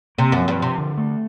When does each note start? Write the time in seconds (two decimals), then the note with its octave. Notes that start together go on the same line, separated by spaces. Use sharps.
0.18 C3 A#3
0.32 F#2
0.38 F3
0.48 G2
0.57 C3 F3
0.78 D3
0.98 A3